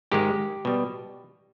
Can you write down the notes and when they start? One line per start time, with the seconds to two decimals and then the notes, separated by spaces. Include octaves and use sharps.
0.11 G#2 D#3 G#3 G4
0.65 B2 G3